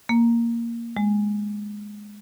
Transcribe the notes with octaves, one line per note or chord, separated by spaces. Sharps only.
A#3
G#3